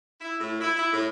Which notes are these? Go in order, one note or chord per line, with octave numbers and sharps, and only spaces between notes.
E4
A2
E4
E4
A2